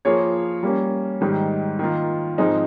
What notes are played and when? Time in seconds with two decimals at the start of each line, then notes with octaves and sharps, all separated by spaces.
0.05 F3 A#3 F4 G#4 C#5
0.63 G3 A#3 C#4
1.21 G#2 D#3 G3
1.79 D#3 A#3 F4
2.38 G#2 F3 G#3 C4 D#4